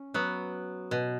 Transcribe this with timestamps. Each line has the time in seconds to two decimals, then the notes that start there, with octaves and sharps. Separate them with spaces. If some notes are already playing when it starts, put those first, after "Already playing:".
Already playing: C#4
0.14 F#3 B3
0.91 B2